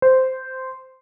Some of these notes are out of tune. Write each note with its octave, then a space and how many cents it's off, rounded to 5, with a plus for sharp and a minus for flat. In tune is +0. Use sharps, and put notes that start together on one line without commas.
C5 -10